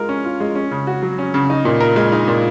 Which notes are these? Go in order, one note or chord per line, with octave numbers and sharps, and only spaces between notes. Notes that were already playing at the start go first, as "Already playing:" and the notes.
Already playing: G#3 F4 A#4
C#4
F4
G#3
C#4
C#3
F#4
F#3
C#4
C#3
D#4
A#2
A#4
G#3
D#4
A#2